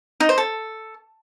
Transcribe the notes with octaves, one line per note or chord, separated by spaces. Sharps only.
D#4
C5
A4